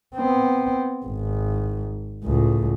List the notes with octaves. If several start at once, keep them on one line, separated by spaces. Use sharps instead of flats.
B3 C4
G#1
C#2 A2